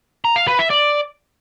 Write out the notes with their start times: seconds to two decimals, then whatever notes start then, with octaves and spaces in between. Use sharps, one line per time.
0.25 A#5
0.36 F5
0.47 B4
0.59 E5
0.70 D5